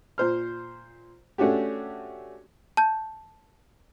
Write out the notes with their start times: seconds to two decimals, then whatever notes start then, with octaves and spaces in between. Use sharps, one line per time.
0.18 A#2 C5 F6
1.38 A3 C#4 D4 F#4 G4
2.77 A5 G6